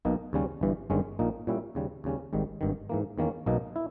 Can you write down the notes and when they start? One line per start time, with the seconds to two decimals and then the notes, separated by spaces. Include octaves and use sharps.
0.05 B1 B2 A#3 D#4
0.33 D#2 C#3 G3 C#4
0.61 G1 G2 E3
0.90 G1 G2 D#3 G#3 C#4
1.19 A#1 A#2 A#3 D#4
1.47 A#2 G3 C#4 E4
1.75 D#2 C#3 G3
2.04 D#2 C#3 G3 C#4
2.33 G#1 G#2 D#3 G3
2.61 G#1 G2 D#3
2.89 G#2 E3 A#3
3.18 E2 D#3 A#3 C#4
3.46 B1 B2 A#3 D#4
3.76 E4